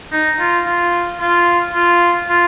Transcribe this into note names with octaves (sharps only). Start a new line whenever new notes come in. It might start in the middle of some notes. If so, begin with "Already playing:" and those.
D#4
F4
F4
F4
F4
F4